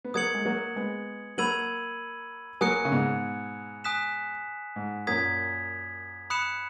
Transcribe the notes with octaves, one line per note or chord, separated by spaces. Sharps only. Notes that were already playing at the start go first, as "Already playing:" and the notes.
B3
F#3 A#3 D#6 G#6 C#7 F#7
G#3
F#3 A#3
G#3 B3
F#3 A#3 B5 E6 G#6 D#7 F#7
F#3 A#3 G#5 D#6 F#6 C#7
C#3
G#2 B2
G#5 D#6 F#6 B6 E7
G#2
F#2 A#2 D#6 G#6 B6
B5 D#6 F#6 C#7 E7